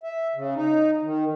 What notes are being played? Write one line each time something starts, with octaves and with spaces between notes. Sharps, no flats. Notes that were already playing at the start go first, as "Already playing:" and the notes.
E5
C#3
D#4
D#3